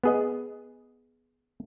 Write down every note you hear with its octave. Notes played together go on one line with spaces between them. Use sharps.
B3 G#4 D#5